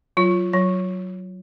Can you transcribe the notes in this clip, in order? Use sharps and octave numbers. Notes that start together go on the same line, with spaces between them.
F#3 F4
F#3